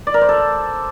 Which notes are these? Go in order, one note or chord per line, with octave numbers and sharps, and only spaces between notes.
D5
A#4
C5
A4